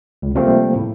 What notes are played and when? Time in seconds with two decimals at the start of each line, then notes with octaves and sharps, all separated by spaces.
0.22 C#2
0.35 C3 F3 G3 A3 A#3 C4
0.76 A2